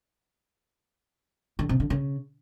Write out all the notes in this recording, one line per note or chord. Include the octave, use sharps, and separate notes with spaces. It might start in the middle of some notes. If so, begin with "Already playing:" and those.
D3
C3
D3
C#3